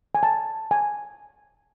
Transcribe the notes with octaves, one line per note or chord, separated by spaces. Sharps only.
G#5
A5
G#5